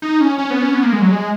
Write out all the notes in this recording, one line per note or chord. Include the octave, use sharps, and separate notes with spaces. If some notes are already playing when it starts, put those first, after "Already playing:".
D#4
C#4
C#4
B3
C#4
B3
A#3
G#3
F#3
G#3